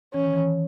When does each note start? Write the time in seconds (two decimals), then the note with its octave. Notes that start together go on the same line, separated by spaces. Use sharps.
0.14 E3 C#4
0.24 D#3
0.34 E3